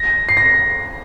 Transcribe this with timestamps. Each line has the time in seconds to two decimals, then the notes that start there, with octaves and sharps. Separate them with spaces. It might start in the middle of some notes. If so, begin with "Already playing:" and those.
Already playing: A#6
0.29 C7
0.37 A#6